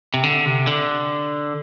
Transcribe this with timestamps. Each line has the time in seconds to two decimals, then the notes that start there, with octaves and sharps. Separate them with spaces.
0.14 C3
0.24 D3
0.46 C3
0.67 D3